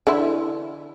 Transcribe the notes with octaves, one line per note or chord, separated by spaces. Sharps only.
D3 E3 E4